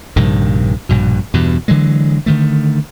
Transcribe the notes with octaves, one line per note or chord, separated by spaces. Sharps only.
A#1 G2 C3 D#3
A#1 G2 B2
E2 G2 B2
D3 E3 F#3 G#3
D3 D#3 A3